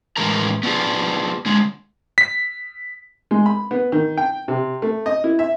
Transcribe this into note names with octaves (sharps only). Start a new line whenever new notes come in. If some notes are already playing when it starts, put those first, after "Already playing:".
A2 E3 G#3 A#4 A#5
B3 C#4 D4 E4 F4 G#4
D3 G#3
B6
G#3
B5
B3
D#3
G5
C3
A3
D#5
E4
E5